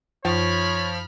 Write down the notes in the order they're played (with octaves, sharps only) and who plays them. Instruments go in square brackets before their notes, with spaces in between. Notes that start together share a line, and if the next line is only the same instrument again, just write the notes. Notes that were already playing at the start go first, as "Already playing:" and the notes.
[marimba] F#2 C#6 [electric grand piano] F3 [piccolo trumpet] C#5 [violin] B5 F6